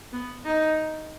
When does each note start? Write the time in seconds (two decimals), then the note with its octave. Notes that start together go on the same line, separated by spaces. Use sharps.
0.13 B3
0.45 D#4